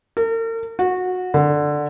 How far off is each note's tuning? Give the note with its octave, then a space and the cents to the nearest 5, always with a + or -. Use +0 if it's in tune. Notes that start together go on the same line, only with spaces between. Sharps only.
A#4 -45
F#4 -20
D3 +5